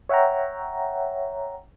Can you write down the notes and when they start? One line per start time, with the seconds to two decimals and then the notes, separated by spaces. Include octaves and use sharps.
0.09 C#5 E5 F#5 G5 A#5